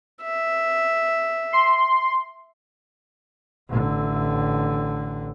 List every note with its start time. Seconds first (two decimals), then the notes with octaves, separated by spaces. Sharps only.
0.23 E5
1.53 C6
3.70 A1 D3